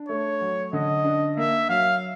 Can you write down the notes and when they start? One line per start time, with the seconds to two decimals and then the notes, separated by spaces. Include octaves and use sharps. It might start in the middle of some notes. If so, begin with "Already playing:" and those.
Already playing: D4
0.08 A3 C#5
0.41 F#3
0.73 D3 D#5
1.04 D4
1.37 A#3 E5
1.69 F#3 F5